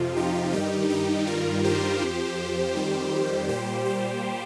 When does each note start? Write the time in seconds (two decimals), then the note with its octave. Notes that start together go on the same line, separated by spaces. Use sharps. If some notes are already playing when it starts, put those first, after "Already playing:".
Already playing: F2 C3 F3 F4
0.17 D#4 G4
0.53 G2 D#3 G3 D#4 G4
0.90 D#4 G4
1.27 G2 D#3 G3 F4 A#4
1.64 G4 C5
2.01 F2 F3
2.74 F2 D#3 G3
3.49 A#2 G3 G4 C5
3.85 G4 C5